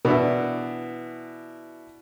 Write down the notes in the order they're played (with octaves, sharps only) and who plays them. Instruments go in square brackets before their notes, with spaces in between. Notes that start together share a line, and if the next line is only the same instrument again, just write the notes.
[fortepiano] B2 E3 D4 E4